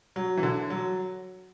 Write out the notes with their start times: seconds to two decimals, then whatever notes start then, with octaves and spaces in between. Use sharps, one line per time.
0.16 F#3
0.37 E3
0.43 D3
0.70 F#3